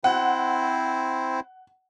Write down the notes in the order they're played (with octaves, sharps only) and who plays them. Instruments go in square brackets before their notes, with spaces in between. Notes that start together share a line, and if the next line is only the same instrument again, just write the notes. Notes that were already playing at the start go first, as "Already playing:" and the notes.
[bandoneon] C4 E4 C5 [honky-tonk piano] F#5